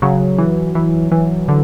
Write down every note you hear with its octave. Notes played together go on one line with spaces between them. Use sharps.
C#3 F#3
E3
E3
E3
D3